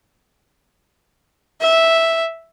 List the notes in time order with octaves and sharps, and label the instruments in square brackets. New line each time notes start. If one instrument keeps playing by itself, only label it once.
[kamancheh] E5